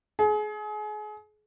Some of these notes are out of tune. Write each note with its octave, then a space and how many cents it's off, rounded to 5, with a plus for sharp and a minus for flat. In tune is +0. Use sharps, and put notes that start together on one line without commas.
G#4 +30